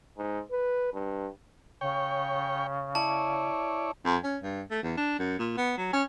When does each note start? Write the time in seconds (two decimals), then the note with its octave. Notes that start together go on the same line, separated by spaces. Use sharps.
0.18 G#2
0.51 B4
0.93 G2
1.81 C#3 C#5 G5
2.95 E4 C#5 D5 A5
4.05 F2
4.24 C#4
4.43 G2
4.71 A3
4.83 E2
4.97 D4
5.19 F#2
5.39 A#2
5.57 B3
5.78 F#3
5.93 C#4